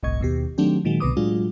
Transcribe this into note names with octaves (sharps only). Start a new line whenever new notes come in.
G1 C2 A2 D#5 C#6 G#6
D#2 B2 G4
D#3 F#3 A3 C4 D4 G4
A#2 D#3 F#3 G#3
C2 B2 D3 B4 D6 D#6
A2 F#3 G#3 D4 F4